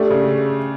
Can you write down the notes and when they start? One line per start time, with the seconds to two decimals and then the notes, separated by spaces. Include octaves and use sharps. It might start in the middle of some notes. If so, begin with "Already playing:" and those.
Already playing: A3 D4 G4 A4
0.11 C#3